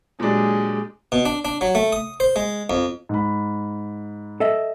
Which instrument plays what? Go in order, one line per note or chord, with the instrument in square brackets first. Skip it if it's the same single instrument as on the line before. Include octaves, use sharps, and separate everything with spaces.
[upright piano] A#2 F#3 D4 [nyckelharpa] G#3 G4
[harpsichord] B2
D4
D4
F#3
A3
D#6
C5
G#3
F2
[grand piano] G#2 B5
[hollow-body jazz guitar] A4 D#5 E5